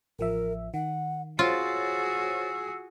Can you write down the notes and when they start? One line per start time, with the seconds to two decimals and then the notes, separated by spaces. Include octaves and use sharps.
0.19 A1 F3 A#4 E5
0.74 D#3 F#5
1.39 F4 F#4 G#4 C5 C#5 E6 A6